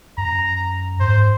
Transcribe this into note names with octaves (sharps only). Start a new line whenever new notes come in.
F#2 A#5
G#2 C5